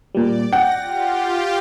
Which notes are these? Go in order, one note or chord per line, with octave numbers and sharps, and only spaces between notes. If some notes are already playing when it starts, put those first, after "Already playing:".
A#2 G3 D5
F#5 G5 A#6
F4 G4